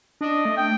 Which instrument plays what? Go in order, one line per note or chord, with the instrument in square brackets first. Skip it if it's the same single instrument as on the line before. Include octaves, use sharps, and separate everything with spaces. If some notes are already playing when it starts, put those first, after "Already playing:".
[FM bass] D4 [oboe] D#5
[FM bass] A3
[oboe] G5